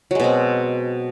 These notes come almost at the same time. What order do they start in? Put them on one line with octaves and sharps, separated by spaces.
F#3 G#3 B2 C4